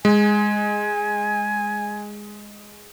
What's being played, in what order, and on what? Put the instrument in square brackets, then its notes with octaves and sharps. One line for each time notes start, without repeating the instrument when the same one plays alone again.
[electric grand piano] G#3 [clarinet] G#5